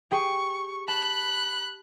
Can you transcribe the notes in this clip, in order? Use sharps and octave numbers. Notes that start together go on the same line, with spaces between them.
G4 G#4 G5 C#6
A5 B5 F#6